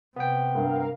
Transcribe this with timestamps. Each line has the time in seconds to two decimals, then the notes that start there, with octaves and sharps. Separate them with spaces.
0.16 C3 B3 G5
0.55 G2 A#4 F5